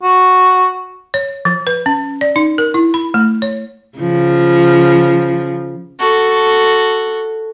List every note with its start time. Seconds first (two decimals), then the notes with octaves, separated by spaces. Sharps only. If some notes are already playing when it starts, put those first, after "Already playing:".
0.03 F#4
1.14 C#5
1.45 F3
1.67 B4
1.86 C#4
2.21 D5
2.36 D#4
2.58 A#4
2.74 E4
2.94 B5
3.14 A3
3.42 C#5
3.98 C#3 F3
6.00 F#4 A4